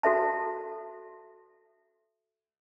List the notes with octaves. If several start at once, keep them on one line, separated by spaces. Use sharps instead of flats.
F#4 A4 E5 A5